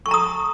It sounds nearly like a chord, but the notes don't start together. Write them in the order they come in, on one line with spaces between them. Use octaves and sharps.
C#6 A5 A#5 D#6